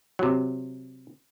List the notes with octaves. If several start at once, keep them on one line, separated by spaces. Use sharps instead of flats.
C3 F#3